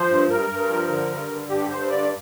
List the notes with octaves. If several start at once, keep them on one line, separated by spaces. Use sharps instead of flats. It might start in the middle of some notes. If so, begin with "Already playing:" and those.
Already playing: F3 C5
G2
G2 A#4
G2
F3
D3
G2
D3
G2 G4
G2 C5
D3 D5